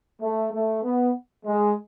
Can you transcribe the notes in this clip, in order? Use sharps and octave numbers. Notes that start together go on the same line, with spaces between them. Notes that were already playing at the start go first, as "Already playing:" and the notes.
A3
A3
B3
G#3